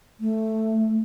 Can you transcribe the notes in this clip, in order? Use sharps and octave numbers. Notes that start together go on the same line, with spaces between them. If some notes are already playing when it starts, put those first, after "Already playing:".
A3